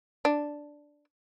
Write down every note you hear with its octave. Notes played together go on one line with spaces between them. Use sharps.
D4